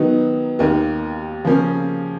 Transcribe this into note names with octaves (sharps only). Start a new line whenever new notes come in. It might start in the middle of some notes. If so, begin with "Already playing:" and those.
Already playing: D#3 F#3 B3 D#4
D#2 D#3 A#3
C#3 F3 A#3 C#4